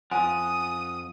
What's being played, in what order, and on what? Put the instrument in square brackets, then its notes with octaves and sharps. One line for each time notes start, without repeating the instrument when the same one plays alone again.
[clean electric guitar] F2 F3 [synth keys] F#5 [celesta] G#5 [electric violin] D#6